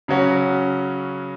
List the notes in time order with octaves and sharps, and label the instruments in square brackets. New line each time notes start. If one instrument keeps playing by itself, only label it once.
[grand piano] C#3 F#3 C#4 F#4